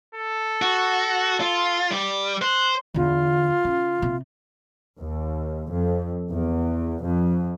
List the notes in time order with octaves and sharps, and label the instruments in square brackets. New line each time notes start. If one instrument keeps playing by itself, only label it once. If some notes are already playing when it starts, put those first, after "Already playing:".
[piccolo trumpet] A4
[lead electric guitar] F#4
F4
G3
[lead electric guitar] C5 [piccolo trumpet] F#6
[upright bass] E2 D3 [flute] F4
[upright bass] C#3
C3
[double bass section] D#2
F2
E2
F2